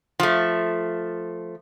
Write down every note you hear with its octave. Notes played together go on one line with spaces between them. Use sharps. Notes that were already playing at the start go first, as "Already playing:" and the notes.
F3 A3